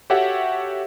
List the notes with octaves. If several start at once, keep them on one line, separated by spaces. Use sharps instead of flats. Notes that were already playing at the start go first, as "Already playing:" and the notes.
F#4 G4 A4 C#5 E5 F#5